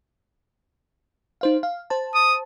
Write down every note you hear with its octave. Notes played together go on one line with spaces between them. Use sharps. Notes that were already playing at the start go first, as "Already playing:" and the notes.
D#4 C5 F5
F5
C5 A5
D#6